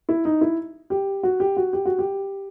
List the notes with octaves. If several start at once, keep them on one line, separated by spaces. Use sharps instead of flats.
E4
D#4
E4
G4
F#4
G4
F#4
G4
F#4
G4